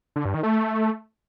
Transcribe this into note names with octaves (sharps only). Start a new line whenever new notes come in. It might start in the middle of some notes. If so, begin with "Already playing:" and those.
D3
G2
D#3
A3